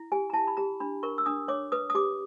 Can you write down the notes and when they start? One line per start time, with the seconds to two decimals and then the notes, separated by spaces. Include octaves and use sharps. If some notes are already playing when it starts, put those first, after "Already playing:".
Already playing: E4
0.12 G4 G#5
0.30 A#5
0.33 E4 A5
0.47 B5
0.57 G4 A#5
0.80 D4 B5
1.03 A#4 C#6
1.18 E6
1.26 D4 D#6
1.48 C#5 D6
1.72 B4 D#6
1.90 D#6
1.95 G4 D6